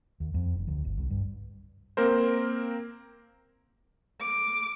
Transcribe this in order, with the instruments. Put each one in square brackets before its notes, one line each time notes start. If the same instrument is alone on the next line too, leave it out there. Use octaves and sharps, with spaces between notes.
[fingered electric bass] D#2
F2
F#1
D2
G1
C2
G2
[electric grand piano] A#3 C4 A#4 C5
[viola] D6